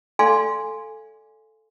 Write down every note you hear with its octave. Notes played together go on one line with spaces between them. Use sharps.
A4 D5 F5 G#5 C6 D6